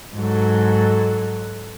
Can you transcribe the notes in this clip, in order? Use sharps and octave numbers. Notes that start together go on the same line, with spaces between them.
G#2 F#3 A4